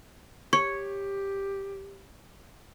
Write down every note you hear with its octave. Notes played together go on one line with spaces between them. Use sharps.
G4 C#5 C#6